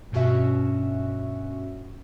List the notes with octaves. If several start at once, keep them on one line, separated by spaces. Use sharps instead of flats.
G2 B2 C#4 F#4 E5